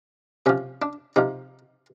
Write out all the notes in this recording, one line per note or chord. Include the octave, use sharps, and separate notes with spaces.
C3 F3 C#4
D4
C3 F3 D#4